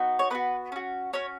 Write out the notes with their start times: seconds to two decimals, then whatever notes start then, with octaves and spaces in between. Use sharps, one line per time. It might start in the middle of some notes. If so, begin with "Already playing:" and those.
Already playing: B3 D#4 F#4
0.19 C#5
0.30 B3 D#4 B4
0.35 F#4
0.72 C#4 F#4
1.13 C#4 F#4 C#5